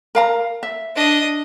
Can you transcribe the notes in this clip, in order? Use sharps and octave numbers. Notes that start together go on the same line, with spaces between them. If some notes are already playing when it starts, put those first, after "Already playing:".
A#4 F5 A#5
E5
D4 D#5